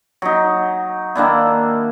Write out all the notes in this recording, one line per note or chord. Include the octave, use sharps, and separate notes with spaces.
F#3 D#4
D#3 A#3 D4 E4